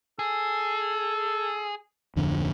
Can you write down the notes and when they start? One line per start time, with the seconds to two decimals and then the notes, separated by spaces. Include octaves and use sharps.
0.19 G#4 A4
2.16 D1 F2 D3